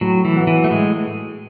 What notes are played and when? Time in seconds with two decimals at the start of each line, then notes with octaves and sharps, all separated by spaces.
0.01 A2 F#3
0.25 E3
0.36 F#3 B3
0.47 E3
0.64 A3
0.70 A2 G#3